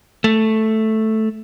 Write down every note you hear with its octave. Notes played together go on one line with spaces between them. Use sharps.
A3